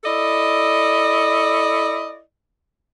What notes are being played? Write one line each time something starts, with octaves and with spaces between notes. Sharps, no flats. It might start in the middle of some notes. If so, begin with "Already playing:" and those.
E4 A4 D5 D#5